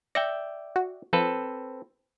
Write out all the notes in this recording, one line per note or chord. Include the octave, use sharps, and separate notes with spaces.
D5 E5 G5 A#6 C#7
F#4
F3 C4 A4 B4